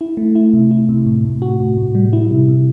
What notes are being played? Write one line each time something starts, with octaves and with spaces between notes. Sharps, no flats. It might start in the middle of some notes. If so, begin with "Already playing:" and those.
E4
A3
E4
C3
E4
C3
A2
A2
F#4
A2
A2
G3
E4
C3
C3